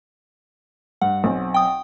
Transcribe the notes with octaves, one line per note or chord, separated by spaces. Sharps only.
G2 F#5
B1 C4
G5 D#6